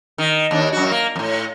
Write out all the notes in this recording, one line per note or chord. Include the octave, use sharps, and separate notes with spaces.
D#3
D#2 D4
F#2 F#4
A#3
F2 A2